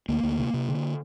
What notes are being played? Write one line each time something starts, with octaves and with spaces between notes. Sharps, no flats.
D2 A#3
D2
C3
C3
D3